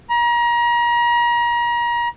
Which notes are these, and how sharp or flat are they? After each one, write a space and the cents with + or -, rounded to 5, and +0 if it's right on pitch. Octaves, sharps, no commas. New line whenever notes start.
A#5 +35